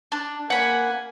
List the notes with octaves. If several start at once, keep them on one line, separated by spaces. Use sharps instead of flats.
D4
A#3 F#5 G#5 B5